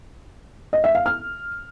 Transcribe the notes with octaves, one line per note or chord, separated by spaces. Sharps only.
D#5
E5
F5
F6